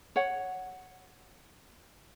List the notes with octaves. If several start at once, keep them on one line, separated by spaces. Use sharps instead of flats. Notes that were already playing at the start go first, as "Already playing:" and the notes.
C#5 F#5